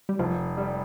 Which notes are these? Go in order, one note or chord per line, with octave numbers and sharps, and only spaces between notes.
G3
F1 F3
G3